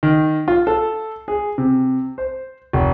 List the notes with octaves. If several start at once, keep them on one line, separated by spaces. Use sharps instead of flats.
D#3
F4
A4
G#4
C3
C5
F1